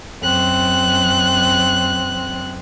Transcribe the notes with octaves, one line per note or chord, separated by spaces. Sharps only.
F#2 C4 F#6